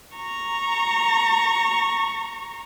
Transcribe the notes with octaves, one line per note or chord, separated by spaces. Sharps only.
A#5 C#6